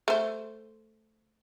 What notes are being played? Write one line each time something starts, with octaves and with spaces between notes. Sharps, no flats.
A3 C5